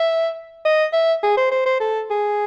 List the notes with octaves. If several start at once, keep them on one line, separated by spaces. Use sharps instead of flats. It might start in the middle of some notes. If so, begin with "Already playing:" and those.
Already playing: E5
D#5
E5
G#4
C5
C5
C5
A4
G#4